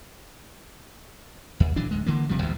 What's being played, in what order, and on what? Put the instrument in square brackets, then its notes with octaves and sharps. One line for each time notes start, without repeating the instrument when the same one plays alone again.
[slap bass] D#2
D#1 E3 F#3 D4
D1 G#3
D3 E3 A#3
E1 C3 F3 G3
B1 E2 G2 A#2